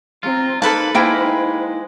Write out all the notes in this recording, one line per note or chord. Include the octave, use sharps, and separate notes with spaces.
C4 F4 A#5
A#3 D#4 A4 B4 C5 A5
G#3 A#3 E4 G5